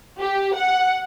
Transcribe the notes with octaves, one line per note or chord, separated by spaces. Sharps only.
G4
F#5